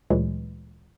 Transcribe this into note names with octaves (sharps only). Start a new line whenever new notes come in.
D2 A#2 E3 F#3 G#3